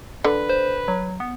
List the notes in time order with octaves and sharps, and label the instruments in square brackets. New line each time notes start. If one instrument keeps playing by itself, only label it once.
[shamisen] D3 [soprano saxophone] B4
[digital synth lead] C5
F#3
B3